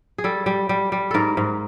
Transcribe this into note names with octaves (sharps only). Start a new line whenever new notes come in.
G#4
G3 A4
G3
G3
G3
G#2 A4 A#4
G#2